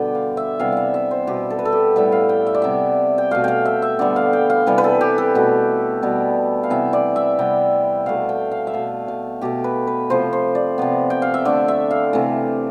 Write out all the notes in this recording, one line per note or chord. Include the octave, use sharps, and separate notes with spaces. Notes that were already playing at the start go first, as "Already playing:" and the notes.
Already playing: B2 D3 G3 B3 A4 D5 G5
F5
E5
C3 E3 G3 B3 F5
E5 F5
E5
C5
B2 G3 B3 G4
A4
B4
A4
G4
A2 G3 B3 E5
F5
G5
E5
D5
C3 G3 B3 E5
G5
B2 A3 F5
F5 G5
E5
E5
D3 G3 B3 D5
F5
G5
F5
C3 E3 G3 B3 B4
B4
A4
G4
A4
B2 A3
B2 G3 B3
F5
C3 E3 B3 E5
D5
E5
C3 G3 B3 G5
B2 A3 F5
G5
F5
E5
B2 A3 F5
F5
B2 A3 G4
B4
B4
C3 F3 A3 C5
C5
D5
C3 F3 B3
G5
F5
E5
D3 A3 D5
E5
F5
C3 E3 A3